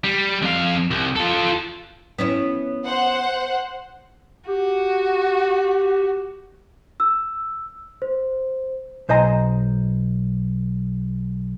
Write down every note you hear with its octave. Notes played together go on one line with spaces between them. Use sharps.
G3
F2 F5
C2
F4 A4
B3 C#4 E4
C5 F#5
F#4 G4
E6
C5
B1 C5 D#5 G#5 A#5